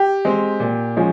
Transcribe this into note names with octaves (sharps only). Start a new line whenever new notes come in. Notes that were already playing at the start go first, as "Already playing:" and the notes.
Already playing: G4
G#3 C4
A#2
F3 G#3 C#4